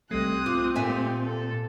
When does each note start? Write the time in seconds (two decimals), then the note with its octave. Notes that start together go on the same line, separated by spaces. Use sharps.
0.11 C2 G3 A3 C4 D#6 F#6
0.46 F4 D6
0.75 A#2 A3 G4 E5 G#5
1.25 A4